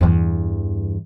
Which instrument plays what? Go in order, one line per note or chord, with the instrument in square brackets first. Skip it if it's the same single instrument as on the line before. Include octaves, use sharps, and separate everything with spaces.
[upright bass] E2 G2